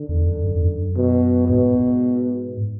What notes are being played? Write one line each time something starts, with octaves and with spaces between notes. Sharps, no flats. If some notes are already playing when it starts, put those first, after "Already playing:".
Already playing: D3
E2
F#2
F#2
E2
F#2
B2
G#2 B2
G#2